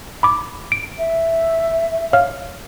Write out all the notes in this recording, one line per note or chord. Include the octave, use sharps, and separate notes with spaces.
B5 D6
D7
E5
C#5 F5 F6